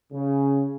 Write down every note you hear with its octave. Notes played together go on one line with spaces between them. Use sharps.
C#3